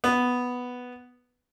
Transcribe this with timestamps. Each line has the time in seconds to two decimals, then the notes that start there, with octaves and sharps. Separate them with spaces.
0.04 B3